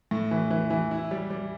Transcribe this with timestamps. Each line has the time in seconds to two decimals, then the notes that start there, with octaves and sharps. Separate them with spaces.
0.11 A2
0.31 E3
0.51 E3
0.70 E3
0.91 E4
1.11 G3
1.30 G3